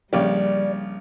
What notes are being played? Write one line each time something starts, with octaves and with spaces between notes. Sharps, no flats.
A#1 C#3 G3 G4 D5